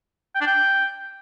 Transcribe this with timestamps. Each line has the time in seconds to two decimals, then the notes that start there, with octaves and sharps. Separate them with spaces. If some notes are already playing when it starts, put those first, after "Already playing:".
0.35 G5
0.41 D4
0.47 G5